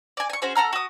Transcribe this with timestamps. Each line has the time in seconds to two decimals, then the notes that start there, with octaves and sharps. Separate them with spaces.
0.17 D5 G#5
0.30 G#5 C#6
0.42 C#4 F#4 G#4 C5
0.55 A4 F#5 A#5 F6
0.73 F#4 D#6